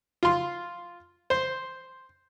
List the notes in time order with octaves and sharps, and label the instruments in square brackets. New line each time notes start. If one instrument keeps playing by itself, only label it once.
[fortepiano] F4 C6
C5